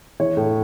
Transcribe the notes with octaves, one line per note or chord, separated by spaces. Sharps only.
E3 C#5
A2